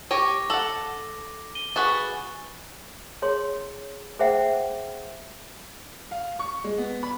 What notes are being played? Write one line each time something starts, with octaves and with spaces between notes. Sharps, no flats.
G4 C#5 D6 A#6 D#7
A4 F#5 F#7
D#7 G7
F#4 G#4 B4 C#6 F#6 A6
G#4 C#5 C6
G#4 C5 E5 F#5 G5
F5
C#6
G#3
B3
B5